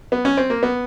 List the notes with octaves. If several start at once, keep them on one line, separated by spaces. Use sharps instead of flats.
B3
C#4
C4
A#3
B3